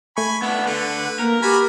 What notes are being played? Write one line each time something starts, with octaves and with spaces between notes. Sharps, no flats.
A3 G#5 B5 C#6
B3 D4 E5
D3 B4
A#3 A#4
F#4 G4 G#5 B5